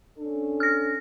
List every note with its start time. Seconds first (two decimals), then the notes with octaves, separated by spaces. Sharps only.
0.18 C#4 D4 A4
0.60 F6 A#6